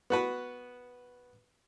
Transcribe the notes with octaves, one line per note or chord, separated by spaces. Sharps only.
B3 F#4 B4